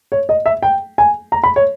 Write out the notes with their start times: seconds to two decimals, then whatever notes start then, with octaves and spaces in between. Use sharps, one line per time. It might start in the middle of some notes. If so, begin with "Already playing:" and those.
0.12 C#5
0.29 D#5
0.46 E5
0.63 G5
0.98 G#5
1.32 A#5
1.44 B5
1.56 C#5